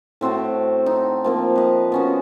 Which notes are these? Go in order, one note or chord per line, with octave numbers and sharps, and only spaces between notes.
A2 C4 F#4 A4
D#4
F3 A#3 C4
B4 D#5
B3 C#4 F#4